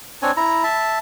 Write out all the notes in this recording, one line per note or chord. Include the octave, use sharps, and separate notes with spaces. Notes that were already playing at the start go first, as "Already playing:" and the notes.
C4 D4 C#5 G#5
E4 A#5
E5 A5